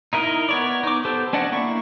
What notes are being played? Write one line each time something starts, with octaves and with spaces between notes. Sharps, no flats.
D#4 E4 A#4 D#5
B3 C#5 D5
D#4 D6
B3 G4 A4 C5
C#4 D4 D5 D#5 F#5
A#3 E4 C#6